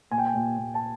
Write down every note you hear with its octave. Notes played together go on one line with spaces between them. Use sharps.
A#2 G#5
G5
G#5
A#2
A#2
A5